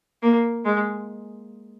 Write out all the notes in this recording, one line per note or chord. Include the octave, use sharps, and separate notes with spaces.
A#3
G#3